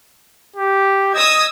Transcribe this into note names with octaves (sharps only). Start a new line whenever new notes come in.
G4
D#5 D#6 E6 G#6